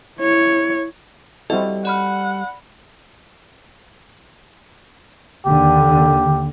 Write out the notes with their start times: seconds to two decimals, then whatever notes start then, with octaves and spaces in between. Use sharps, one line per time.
0.19 E4 C#5
1.50 G3 C4 E4 F#4 A4 D#5
1.85 D5 F#5 B5 F6
5.46 D#2 D3 G4